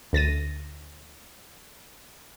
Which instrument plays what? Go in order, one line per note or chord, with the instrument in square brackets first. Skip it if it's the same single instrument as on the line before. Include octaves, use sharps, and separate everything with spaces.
[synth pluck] D2 A6 A#6 D#7